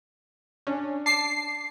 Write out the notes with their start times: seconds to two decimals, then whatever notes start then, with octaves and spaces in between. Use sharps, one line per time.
0.67 C#4 D4
1.06 A5 D6 C7